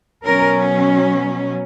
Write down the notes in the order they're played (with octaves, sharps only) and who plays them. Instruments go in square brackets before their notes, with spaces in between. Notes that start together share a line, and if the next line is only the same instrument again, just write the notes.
[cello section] B2 F#3 C#4 A#4